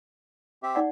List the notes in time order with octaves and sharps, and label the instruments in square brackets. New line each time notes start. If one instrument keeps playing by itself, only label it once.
[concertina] C4 G4 E5
[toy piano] D#4 D5 F#5